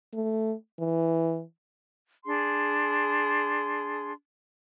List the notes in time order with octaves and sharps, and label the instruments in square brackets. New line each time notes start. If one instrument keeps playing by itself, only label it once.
[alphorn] A3
E3
[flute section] D4 G#4 C6